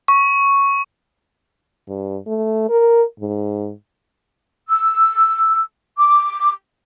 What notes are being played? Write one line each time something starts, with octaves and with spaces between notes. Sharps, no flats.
C#6
G2
A3
A#4
G#2
E6
D6